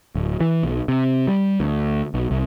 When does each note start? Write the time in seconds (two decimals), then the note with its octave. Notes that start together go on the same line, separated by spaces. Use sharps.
0.15 D1
0.41 E3
0.63 B1
0.88 C3
1.28 G3
1.60 D2
2.14 B1
2.31 C2